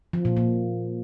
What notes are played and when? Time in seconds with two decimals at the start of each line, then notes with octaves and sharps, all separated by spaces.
0.13 F3
0.25 A#2
0.37 A#2